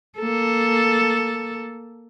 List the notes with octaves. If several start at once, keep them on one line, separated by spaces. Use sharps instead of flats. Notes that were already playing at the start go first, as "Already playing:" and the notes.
A#3 A4